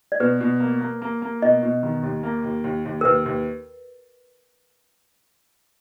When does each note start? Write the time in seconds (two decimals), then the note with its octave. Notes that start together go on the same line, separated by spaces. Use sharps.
0.12 D5
0.20 B2 B4
0.41 B2
0.60 A#3
0.81 A#3
1.02 A#3
1.22 A#3
1.42 B2 D#5
1.63 B2
1.83 D#3
2.03 D#2
2.23 A#3
2.44 D#2
2.64 D#2
2.85 D#2
3.01 A#4
3.05 D#2 B4
3.26 D#2